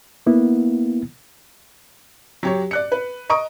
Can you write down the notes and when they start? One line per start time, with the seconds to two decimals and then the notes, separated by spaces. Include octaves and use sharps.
0.27 A#3 B3 E4
2.43 F#3 G4 C#5
2.71 D5 F#6 C#7
2.92 B4
3.30 D#5 A#5 C#6 D#6 D7